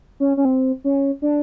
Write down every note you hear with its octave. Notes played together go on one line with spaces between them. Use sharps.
C#4
C#4
C4
C#4
D4